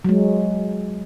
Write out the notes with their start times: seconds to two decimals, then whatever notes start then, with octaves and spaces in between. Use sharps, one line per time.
0.05 F#3 G#3